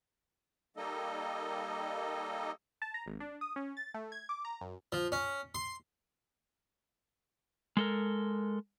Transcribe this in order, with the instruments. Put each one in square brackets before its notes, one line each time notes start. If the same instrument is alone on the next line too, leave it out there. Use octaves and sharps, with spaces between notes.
[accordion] G3 A#3 D#4 A4 D#5
[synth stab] A5
A#5
G#1
D4
D#6
C#4
A6
A3
G#6
D6
A#5
F#2
[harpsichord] F3
C#4
C6
[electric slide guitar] G#3 A4 A#4